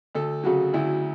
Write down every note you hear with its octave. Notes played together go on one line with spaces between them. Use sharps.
D2 A4
C#3 F#3 F#4
D2 E4